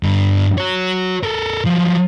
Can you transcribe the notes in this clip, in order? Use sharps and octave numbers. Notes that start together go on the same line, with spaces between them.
G2 D3
F#4 C#5
A4 A#4
F3 F#3